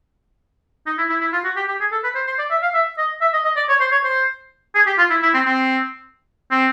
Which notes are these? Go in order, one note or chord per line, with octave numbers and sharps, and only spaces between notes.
D#4
E4
E4
E4
F4
F#4
G4
G4
G#4
A4
B4
C5
C5
D5
E5
F5
E5
D#5
E5
D#5
D#5
D5
C#5
C5
C#5
C5
G#4
G4
F4
E4
E4
C4
C4
C4